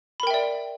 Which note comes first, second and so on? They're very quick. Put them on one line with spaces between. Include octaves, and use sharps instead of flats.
B5 A#4 G5 E5 D5